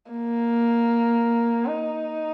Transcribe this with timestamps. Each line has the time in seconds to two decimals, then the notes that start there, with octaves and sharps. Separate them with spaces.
0.11 A#3
1.66 D#4